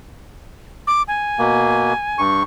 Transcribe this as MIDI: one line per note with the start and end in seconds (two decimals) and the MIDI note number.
0.87 1.02 86
1.08 2.21 80
1.39 1.93 47
1.39 1.93 58
2.18 2.43 43
2.18 2.43 85